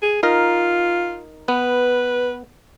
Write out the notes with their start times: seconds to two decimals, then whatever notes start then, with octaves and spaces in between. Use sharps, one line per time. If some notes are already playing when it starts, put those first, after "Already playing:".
0.03 G#4
0.23 D#4 F4 A#4
1.48 B3 B4